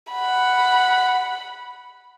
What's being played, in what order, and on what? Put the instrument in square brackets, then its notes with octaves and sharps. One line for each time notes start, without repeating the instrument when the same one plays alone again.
[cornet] F#5 [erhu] B5